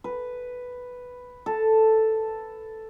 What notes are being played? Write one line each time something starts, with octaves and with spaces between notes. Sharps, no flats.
B4
A4